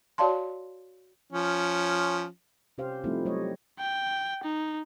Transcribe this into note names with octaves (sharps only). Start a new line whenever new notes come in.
F#4 C#5 D5 F5 A5 C6
F3 C#4
C3 C#4 G4 C5 F5
F3 G3 A3 C4 D#4 E4
F#3 G3 A3 C#5 D#5
G5
D#4